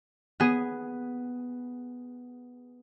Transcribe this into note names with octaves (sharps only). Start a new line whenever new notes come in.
B3 G#4